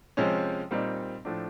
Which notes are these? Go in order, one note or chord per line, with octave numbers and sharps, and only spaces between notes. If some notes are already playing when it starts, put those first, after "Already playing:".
C3 F3 G#3 C#4
A#2 G3 C4 D#4
A2 F3 A3 D4